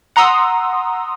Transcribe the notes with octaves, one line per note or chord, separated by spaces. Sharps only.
F#5 A#5 C6 D#6 E6